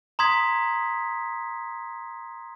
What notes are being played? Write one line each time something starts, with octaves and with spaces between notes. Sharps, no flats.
A#5 C6 D#6 G#6 B6